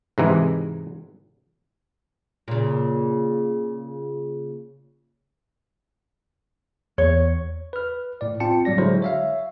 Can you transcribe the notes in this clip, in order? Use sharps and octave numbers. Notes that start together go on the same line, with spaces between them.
G#2 C3 E3 G#3
A#2 C#3
E2 C#5
B4 F6
A2 D5
C4 F4 G5 A5 C#7
A2 F#3 G3 D5 A#6
D3 F#3 G#3 E4 C5
C#5 E5 F5